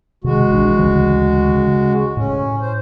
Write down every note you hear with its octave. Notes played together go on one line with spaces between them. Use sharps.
C3 D#3 G#3 F#4
A#1 E3 D4
D2 C#3 E3
C#3
A2 C#4
C5